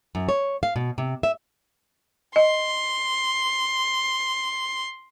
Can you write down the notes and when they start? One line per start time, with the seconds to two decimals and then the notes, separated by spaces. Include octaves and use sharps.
0.15 F#2
0.29 C#5
0.63 F5
0.76 B2
0.98 C3
1.23 E5
2.36 D#5 C6